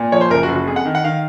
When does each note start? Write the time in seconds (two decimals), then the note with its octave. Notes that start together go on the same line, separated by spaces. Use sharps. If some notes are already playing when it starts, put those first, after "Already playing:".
Already playing: A#2
0.12 F3 C#5
0.21 C5
0.30 F#1 A#4
0.43 F#4
0.48 F#1
0.55 F#4
0.67 F2 G#4
0.76 F#5
0.85 D#3
0.95 F#5
1.04 D#3 F5